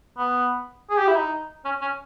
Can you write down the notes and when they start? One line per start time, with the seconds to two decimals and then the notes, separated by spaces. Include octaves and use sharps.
0.18 B3
0.90 G#4
0.98 G4
1.07 E4
1.16 D#4
1.65 C#4
1.81 C#4